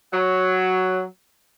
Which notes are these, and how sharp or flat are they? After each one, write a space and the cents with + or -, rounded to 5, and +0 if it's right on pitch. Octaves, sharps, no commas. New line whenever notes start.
F#3 +5